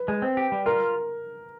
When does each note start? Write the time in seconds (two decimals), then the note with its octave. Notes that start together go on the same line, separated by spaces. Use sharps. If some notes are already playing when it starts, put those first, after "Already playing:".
Already playing: B4
0.08 G#3
0.22 C4
0.37 G4
0.52 G3
0.66 F4 A#4